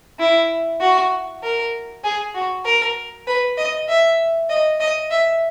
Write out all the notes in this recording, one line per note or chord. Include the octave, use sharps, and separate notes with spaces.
E4
F#4
A#4
G#4
F#4
A#4
B4
D#5
E5
D#5
D#5
E5